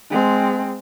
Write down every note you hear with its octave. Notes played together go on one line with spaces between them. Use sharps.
G#3 C4